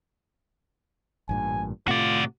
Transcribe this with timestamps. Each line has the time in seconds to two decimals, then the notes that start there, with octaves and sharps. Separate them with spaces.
1.29 A1 G2 A#2 G#5
1.88 A2 C3 A3 F4 F#4 D5